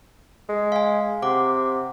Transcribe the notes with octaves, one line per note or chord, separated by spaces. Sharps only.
G#3
F5 G#5
C3 F#5 D6